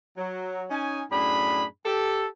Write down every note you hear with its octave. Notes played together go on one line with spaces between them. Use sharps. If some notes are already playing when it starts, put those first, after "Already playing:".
F#3
C#4 D#4 G#5
F#2 A2 D4 G#4 B5
G4 A4